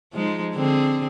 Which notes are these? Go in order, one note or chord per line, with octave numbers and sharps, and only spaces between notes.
F3 G#3 D#4
D3 C4 G#4